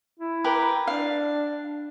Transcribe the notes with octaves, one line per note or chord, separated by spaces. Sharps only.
E4
G4 A#4 B4
D4 F5